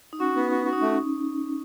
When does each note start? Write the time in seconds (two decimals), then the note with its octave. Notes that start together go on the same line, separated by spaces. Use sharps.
0.13 D#4
0.20 C#4 F#4
0.36 B3
0.51 F#4
0.65 F#4
0.73 D#4
0.82 A3 C#4